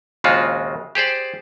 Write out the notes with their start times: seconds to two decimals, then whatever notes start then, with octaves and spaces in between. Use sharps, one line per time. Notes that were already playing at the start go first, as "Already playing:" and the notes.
0.24 A#1 D#2 C#3 G#3 F4 F#4
0.95 G4 G#4 C5 D5